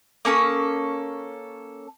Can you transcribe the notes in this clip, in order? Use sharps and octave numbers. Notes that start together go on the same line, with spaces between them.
A#3 C#4 A4 D#6